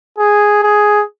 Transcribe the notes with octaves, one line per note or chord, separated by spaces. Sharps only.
G#4
G#4